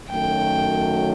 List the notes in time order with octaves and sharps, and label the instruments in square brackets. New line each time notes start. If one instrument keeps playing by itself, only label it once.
[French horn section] F#2 D#3 F#3 A3 [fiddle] G5